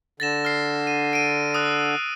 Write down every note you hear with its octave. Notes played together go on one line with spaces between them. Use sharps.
D3 A6 A#6 E7
F6 C7
D#7
D7 D#7
D#6 E6 F#6